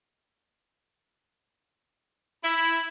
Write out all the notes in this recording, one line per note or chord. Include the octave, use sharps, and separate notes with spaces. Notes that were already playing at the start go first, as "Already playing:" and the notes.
E4